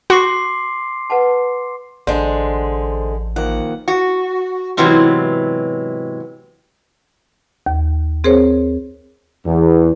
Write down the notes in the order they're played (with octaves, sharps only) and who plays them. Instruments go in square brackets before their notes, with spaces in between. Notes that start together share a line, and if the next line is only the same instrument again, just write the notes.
[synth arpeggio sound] F#4 [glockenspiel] C6 D6 C7
[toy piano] B4 F#5 A5
[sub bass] A1 [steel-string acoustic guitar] D3 G#3 [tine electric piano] C5
[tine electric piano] D#3 F3 A#3 [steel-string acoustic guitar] F#5
[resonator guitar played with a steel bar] F#4
G#2 C3 E3 F#3 B3 E4
[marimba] D#2
C4 G#4 A#4 C5 C#5
[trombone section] E2